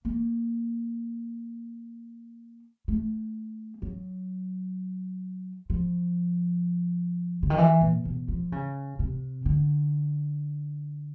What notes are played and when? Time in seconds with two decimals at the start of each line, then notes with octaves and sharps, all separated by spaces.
0.05 A#3
2.88 A3
3.82 F#3
5.70 F3
7.43 D3
7.50 D#3
7.58 E3
7.81 A#2
8.05 B2
8.28 F3
8.52 C#3
8.99 C3
9.46 D3